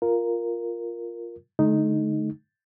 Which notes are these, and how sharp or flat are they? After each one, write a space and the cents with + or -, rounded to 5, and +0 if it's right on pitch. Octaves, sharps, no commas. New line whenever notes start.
F4 +0 A#4 +0
D3 +0 A3 -40 D#4 +0